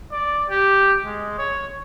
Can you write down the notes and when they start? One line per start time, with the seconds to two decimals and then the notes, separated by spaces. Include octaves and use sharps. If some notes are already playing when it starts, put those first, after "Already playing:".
0.12 D5
0.50 G4
1.04 G#3
1.38 C#5